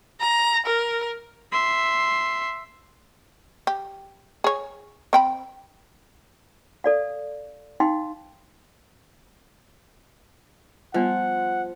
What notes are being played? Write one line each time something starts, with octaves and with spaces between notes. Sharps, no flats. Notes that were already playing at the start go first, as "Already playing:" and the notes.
A#5
A#4
E5 C6
G4
G#4 C#5
C4 G5 B5
A4 D5 F5
D#4 F5 G5 C6
F3 G3 B3 F#5